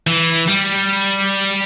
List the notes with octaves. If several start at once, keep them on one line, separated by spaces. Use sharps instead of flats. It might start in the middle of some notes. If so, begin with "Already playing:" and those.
E3
G3